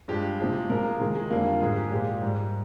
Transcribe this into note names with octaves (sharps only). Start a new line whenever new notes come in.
G2 F3 G#3 G4
C3 F3 G#3
C3 F3 G#3 A#4
G#4
C3 D#3 G#3
G#3
F2 D3 G3 A#3
F4
G#2 F3 G#3 G#4
G4
A#2 F3 G#3 G4
G#2 G3